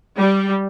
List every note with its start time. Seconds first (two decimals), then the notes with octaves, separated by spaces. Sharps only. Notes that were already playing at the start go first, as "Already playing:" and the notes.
0.17 G3